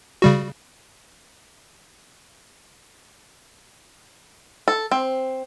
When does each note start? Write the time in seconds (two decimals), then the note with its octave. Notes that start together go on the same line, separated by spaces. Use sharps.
0.22 C#3 G3 F#4
4.68 A4
4.91 C4